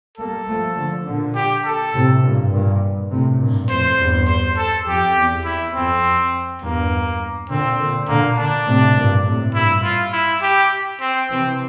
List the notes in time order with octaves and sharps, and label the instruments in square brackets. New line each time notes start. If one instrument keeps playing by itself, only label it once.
[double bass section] G3 A#3 [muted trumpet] A4
[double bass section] F3 A3
D3 F3
A#2 D3
[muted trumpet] G4
A4
[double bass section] A2 C3
G2 A#2
G2 A#2
A2 C3
G2 A#2
[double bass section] F2 A2 [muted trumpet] C5
[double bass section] E2 G2
[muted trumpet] C5
A4
[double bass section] F2 [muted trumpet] G4
[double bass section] E2
[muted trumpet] E4
[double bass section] F2 [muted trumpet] C4
[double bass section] E2 G2 [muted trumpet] A#3
[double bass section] A#2 D3 [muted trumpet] C4
[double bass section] A#2 D3
[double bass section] A#2 D3 [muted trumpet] A#3
[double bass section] A#2 D3 [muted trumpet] D4
[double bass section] A2 C3
G2 A#2
A2 C3
[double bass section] G2 A#2 [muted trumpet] E4
[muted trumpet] F4
E4
G4
C4
[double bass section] C3 E3 [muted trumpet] C4